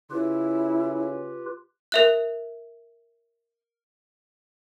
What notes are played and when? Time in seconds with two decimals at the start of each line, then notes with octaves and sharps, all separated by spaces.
0.11 C#3 E4 F4 G4 B4
1.92 A#4 E5 F#6